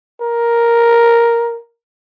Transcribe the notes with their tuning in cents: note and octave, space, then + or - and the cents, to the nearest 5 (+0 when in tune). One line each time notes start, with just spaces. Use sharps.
A#4 +5